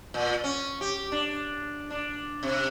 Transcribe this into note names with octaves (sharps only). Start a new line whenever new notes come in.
A#2
C#4
G4
D4
D4
C3